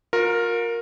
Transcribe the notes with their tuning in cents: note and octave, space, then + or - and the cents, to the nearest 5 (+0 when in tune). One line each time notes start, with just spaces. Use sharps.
F4 +40 A#4 +0